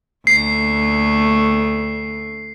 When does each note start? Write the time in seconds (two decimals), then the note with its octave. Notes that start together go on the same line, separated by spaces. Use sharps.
0.27 D2 A3 C7